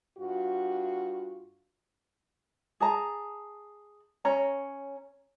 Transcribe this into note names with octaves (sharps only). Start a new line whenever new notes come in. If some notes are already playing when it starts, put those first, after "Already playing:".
G2 F4 F#4
G#4 A5 A#5
C#4 C#5 A#5